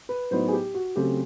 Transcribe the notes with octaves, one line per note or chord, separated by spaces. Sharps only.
B4
A2 F#3 B3 D#4 C5
G#4
G4
F#4
C#3 F#3 A3 C4 G4